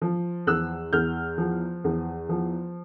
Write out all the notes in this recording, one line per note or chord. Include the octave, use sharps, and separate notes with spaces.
F3
E2 E6 F#6
E2 F6 G6
F3
E2
F3